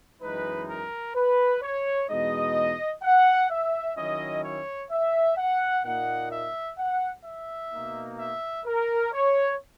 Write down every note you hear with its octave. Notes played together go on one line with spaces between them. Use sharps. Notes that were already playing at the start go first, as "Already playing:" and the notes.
F#2 E3 G#3 D#4 B4
A#4
B4
C#5
E2 B2 G#3 D#4 D#5
F#5
E5
D#3 F#3 C#4 E4 D#5
C#5
E5
F#5
A#2 A#3 D#4 F#5
E5
F#5
E5
B2 A#3 D#4
E5
A#4
C#5